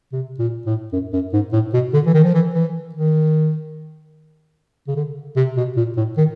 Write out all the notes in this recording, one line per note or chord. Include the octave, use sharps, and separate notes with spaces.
C3
A#2
A2
F#2
F#2
G#2
A2
B2
D3
E3
D#3
F3
E3
E3
D#3
C#3
D3
C3
B2
A#2
A2
D#3